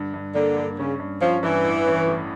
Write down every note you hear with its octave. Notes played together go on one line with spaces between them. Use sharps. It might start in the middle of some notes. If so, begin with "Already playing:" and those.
Already playing: G2 D3
G2
D3 A#3
G2
C#3 C#4
G2
F3 C#4
G2 E3
A1
C#4
A2